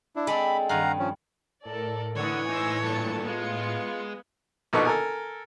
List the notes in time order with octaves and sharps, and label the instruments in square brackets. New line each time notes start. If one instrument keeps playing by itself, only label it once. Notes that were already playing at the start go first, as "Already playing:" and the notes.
[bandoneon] D4 E4
[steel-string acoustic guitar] G#3 [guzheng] C4 D4 A4 [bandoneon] B5
[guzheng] G2 D#3 [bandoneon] F5 F#5 A#5
[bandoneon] F3 C#4
[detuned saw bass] A2 [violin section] A4 A#4 D5
[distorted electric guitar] D3 [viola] E3 C#5 [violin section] D5 F#5 D#6
[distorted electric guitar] D#4 C5 [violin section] G#5 E6 A#6
[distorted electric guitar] G2 A#2 [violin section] A4 A5 C#7
[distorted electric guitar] G#3 [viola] B3 [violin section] F4 C#7
[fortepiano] A#1 B2 B3 D#4 A4 C#6
A4 A#4 G#5